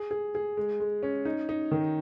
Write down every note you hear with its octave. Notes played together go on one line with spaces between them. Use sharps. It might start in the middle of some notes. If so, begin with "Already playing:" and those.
Already playing: G#4
G#4
G#4
G#3
G#3
C#4
D#4
D#4
D#3